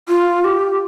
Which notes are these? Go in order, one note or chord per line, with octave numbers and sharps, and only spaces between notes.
F4
G4